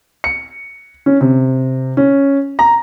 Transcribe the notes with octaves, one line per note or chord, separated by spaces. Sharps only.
C#7
C#4
C3
C#4
A#5